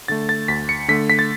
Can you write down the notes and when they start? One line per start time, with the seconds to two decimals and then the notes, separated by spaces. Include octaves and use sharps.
0.08 D3 A3 A6
0.29 A6
0.48 D2 B6
0.69 C#7
0.88 D3 A3 B6
1.10 B6
1.19 A6